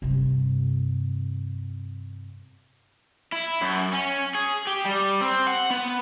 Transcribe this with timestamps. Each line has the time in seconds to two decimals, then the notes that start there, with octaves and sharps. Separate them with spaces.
0.02 G2 C3
3.32 E4
3.61 F#2
3.93 C#4
4.35 G#4
4.67 G4
4.85 G3
5.21 C4
5.47 F#5
5.70 B3